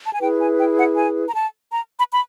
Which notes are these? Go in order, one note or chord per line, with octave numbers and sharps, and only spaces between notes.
A5
G#5
E4 G#4 B4 G5
G#5
G5
F#5
G#5
A#5
A5
A#5
B5
B5